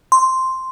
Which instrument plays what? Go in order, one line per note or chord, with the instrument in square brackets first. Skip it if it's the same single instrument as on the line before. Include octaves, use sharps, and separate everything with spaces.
[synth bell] C6